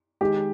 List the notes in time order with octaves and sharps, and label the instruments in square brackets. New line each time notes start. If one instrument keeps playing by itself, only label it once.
[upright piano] D#3 G#3 D#4 G4